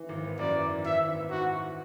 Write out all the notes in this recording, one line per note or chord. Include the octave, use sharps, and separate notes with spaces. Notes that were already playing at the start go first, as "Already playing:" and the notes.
Already playing: E3
G#1
B3
F#2 D5
E3
G#1
E3 E5
G#1
B3
G#2 F#4
E3